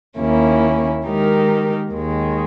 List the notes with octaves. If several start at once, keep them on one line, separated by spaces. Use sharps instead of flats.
D#2 D#3 A#3 C#4 E4
D#3 G#3 D#4 G4 A#4
D#2 D#3 G#3